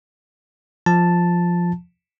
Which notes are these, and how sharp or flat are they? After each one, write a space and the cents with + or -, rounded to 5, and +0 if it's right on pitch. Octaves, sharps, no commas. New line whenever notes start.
F3 +0 A5 +0